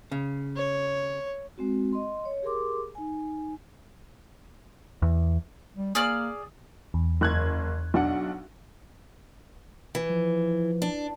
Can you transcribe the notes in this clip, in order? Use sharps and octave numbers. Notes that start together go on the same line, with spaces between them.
C#3
C#5
G#3 C4 F#4
D#5 C6
C#5
G4 G#4 A#4 C6 D6
D#4 G#5
E2
G3
A#3 G#4 D5 F6
E2
F#1 F#6 G#6
B1 D4 F#5
E3
F3
D4